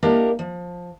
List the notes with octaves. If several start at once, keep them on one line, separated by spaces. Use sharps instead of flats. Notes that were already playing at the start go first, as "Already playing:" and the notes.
A#3 D4 E4 G4 A#4 D#5
F3